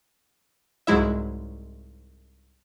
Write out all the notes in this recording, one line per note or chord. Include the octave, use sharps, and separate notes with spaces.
C2 G#2 F#3 G#3 E4 E5